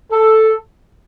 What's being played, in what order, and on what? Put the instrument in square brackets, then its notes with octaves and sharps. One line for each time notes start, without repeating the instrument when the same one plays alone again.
[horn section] A4